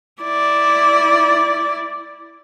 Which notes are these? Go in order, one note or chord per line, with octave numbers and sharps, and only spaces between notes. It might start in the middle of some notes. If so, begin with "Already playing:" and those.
E4 D5